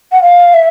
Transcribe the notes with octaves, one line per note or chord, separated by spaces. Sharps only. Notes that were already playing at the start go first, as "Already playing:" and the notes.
F#5
F5
E5